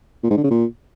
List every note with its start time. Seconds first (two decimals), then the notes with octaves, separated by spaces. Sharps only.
0.24 A#2
0.30 G#2
0.37 D3
0.44 C#3
0.50 A#2